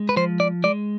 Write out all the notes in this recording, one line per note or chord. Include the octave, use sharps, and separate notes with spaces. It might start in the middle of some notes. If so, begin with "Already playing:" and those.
Already playing: G#3
B4
F3 C5
D5
G#3 D5